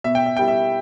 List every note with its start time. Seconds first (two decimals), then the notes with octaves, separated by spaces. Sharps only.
0.04 B2 E5
0.15 G5
0.26 E5
0.37 G3 E4 G5
0.48 E5